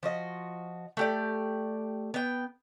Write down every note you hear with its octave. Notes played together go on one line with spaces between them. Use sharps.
F3 F#4 D#5
A3 G4 D5
B3 G5